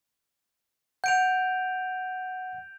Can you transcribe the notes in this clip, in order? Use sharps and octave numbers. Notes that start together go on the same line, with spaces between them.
F#5 G6 D7 F7